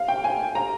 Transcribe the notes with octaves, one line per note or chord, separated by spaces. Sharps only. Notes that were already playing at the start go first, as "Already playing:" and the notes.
Already playing: F5
G5
G#5
A#5